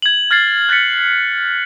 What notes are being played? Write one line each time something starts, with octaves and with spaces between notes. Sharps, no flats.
G#6 F#7
F6 G#6 A6 C7
F#6 G#6 A6 B6 C#7